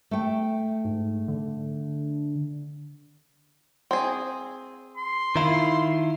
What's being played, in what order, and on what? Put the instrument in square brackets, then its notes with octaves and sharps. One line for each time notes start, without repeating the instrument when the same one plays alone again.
[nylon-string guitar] A3 G5
[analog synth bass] G#2
D3
[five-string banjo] C4 G#4
[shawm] C6
[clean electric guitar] D#3 E4 F4